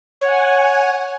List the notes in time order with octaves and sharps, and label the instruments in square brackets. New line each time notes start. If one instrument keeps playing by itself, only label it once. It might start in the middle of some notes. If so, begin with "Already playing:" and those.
[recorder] C#5 [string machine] F#5 G#5